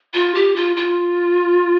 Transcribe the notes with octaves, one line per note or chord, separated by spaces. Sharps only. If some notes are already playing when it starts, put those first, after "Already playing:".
F4
G4
F4
F4